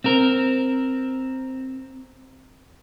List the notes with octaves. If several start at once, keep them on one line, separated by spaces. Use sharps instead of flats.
C4 A#4